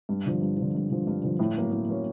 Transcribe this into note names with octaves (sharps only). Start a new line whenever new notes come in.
G2
D3 F3
G2
D3 F3
G2
D3 F3
G2
D3 F3
A2
F#3 A#3 C#4
A2
F#3 A#3 C#4